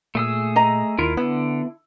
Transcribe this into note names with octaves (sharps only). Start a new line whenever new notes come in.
A#2 A3 G#4 E6
D#5 A#5
D#2 E4 F4 A#4
D3 B3 E4